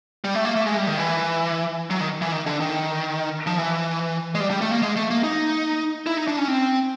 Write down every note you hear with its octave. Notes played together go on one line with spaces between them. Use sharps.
G3
A3
A#3
A3
G#3
G3
D#3
E3
F#3
D#3
E3
D#3
D3
D#3
F3
E3
G#3
G3
G3
A3
A#3
G#3
A3
A#3
D#4
E4
D#4
D4
C#4
C4